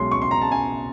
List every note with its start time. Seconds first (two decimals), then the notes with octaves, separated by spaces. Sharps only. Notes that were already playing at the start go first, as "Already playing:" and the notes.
Already playing: B1 B2 G#3 C#4 C6
0.11 C#6
0.22 C6
0.31 A#5
0.41 A5
0.52 G#5